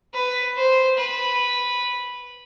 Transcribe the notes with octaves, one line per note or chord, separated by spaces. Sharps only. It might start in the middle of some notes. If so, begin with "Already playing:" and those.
B4
C5
B4